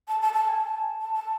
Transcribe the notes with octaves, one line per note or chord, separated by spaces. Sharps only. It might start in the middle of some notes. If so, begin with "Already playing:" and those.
A5
A5
A5
G#5
A5
A5
A5